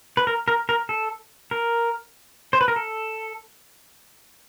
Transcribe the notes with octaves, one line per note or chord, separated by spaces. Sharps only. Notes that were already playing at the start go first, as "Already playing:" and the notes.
B4
A#4
A#4
A#4
A4
A#4
C5
B4
A#4
A4